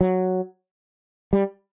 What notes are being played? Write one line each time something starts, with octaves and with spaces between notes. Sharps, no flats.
F#3
G3